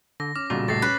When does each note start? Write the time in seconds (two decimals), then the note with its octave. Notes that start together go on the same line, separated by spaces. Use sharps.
0.20 D3 A#6
0.36 C#4 D6 F6
0.50 B1 A#2 C#3 G3 F#4
0.68 C#2 A2 A3 A6 A#6 C7
0.82 C#4 B4